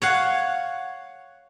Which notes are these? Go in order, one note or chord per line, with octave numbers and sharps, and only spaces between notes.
C#5 F5 F#5